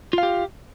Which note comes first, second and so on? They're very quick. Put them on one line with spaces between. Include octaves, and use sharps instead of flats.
F4 F5 G4